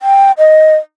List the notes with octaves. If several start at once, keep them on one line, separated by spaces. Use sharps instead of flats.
G5
D#5